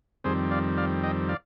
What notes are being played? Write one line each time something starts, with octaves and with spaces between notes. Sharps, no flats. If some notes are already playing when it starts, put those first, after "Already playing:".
F2 D#3 G3 C4 G#4 C5
D5 F5
D5 F5
D#5 G5
D5 F5